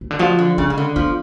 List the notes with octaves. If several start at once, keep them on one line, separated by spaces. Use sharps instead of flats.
C#3
D3
F3 F#3
D3
C#3 G#3
C#3
D3
F3 B3